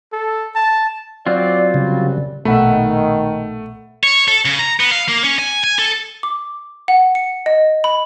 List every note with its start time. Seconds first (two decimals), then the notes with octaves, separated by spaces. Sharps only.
0.13 A4
0.56 A5
1.26 F#3 C4 F4 D5
1.74 F#2 C#3 G3
2.45 A#1 B2 D#3 A3 E5 F#5 B5
4.03 C#5
4.28 A4
4.45 C#3
4.59 A#5
4.80 B3
4.91 F5
5.09 A#3
5.24 C#4
5.39 G#5
5.64 G#5
5.79 A4
6.23 D6
6.88 F#5
7.15 C#7
7.46 D#5
7.84 B5